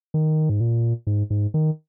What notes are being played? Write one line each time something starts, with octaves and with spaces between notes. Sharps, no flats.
D#3
G#2
A#2
G#2
G#2
D#3